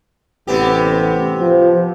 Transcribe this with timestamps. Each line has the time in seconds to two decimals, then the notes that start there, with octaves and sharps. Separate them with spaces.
0.47 A1 C3 B3 G4
1.40 F3